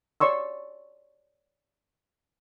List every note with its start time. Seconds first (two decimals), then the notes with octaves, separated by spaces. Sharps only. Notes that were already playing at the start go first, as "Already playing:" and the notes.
0.20 C#5 D5 C6 C#6 E6